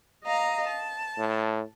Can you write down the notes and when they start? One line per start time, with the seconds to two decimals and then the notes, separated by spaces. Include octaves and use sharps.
0.25 D#5 F5 A#5
0.67 A5
1.18 A2